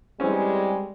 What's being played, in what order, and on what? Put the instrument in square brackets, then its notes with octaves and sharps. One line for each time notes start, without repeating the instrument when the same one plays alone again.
[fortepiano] E3 C4 C#4 [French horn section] G3 G#3